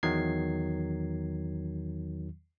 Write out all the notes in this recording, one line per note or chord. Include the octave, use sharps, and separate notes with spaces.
E2 D#3 F#3 G#6 C7